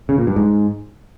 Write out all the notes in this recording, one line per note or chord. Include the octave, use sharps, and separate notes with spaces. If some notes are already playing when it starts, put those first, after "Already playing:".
C#3
A#2
G2
G#2